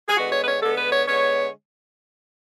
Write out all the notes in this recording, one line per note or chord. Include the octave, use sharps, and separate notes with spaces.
G#4
D3 G#3 B3 F#4
C#5
B4
C#5
D3 G#3 B3 A4
B4
C#5
D3 G#3 B3 C#5